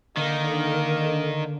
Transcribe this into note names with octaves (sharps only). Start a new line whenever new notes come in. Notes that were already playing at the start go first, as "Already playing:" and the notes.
D3 D#3 A#3 A#4